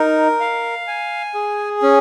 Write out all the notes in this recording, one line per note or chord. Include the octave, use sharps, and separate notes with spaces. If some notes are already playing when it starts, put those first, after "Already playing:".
Already playing: D#4 A#4
F5
G#5
G#4
C#4